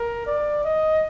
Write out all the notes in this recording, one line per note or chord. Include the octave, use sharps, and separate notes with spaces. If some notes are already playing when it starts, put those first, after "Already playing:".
Already playing: A#4
D5
D#5